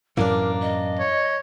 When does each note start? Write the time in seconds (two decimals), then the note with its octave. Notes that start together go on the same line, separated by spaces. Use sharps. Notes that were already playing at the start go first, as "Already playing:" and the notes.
0.17 F#2 A2 E3 A#3 D4 A#4
0.61 D#5
0.99 C#5